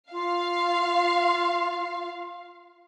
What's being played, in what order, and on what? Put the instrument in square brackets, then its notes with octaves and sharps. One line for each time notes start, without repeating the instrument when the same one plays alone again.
[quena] F4 [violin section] F5